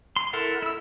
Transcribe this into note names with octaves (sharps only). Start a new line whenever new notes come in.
C6
E4 A4 A#4 F#5
E4 E6